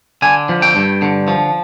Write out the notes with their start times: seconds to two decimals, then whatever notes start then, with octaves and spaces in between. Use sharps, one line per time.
0.22 D3 G#5
0.49 F3
0.62 G5
0.76 G2
1.02 D3
1.28 F3